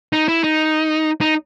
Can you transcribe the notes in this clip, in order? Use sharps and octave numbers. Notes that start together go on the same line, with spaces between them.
D#4
E4
D#4
D#4